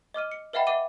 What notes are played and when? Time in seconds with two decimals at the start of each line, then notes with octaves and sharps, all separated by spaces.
0.14 D#5 D6 F6 D#7
0.32 C#7
0.53 B4 D#5 E5 F#5 G5 B5
0.67 E5 F#5 D6 D#7